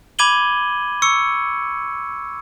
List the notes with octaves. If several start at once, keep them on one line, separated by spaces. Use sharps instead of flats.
B5 D6 G#6 D#7 F#7 G7
C#6 E6 C#7